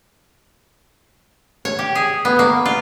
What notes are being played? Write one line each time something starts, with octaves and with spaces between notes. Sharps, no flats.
C#5
G4
G#4
B3
A#3
F4